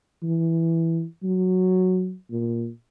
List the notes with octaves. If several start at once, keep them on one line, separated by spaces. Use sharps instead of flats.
E3
F#3
A#2